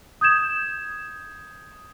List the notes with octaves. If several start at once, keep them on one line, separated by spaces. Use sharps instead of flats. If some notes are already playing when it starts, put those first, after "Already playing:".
D#6 G6 G#6 E7